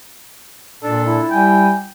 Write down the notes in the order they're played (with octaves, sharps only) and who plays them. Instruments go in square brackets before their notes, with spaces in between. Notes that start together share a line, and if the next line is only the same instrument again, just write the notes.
[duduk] A#2 [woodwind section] D4 [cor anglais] A4 [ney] D5
[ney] D4 [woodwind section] E4
[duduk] G3 [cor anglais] G5 [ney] G#5